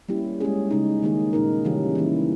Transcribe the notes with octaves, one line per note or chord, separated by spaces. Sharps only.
G3 A#3 C#4 E4 G4
G#3 C#4 G#4
C#3 G#3 D#4
D#3 A#3 D#4 G#4
A#2 A#3 D#4 A#4
C#3 E3 G3 C#4 G4
E3 A#3 E4